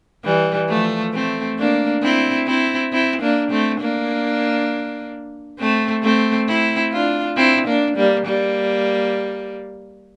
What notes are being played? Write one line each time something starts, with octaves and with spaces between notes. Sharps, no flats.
E3 G3
F3 A3
A3 C4
A#3 D4
C4 E4
C4 E4
C4 E4
A#3 D4
A3 C4
A#3 D4
A3 C4
A3 C4
C4 E4
D4 F4
C4 E4
A#3 D4
G3 A#3
G3 A#3